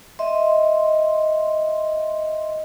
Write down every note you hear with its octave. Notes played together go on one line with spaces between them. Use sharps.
D#5 E5 C6